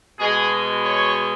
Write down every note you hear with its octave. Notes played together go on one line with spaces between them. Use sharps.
B2 G#3 G#4
C#5